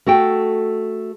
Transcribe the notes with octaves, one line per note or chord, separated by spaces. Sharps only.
A3 F#4 A4 G5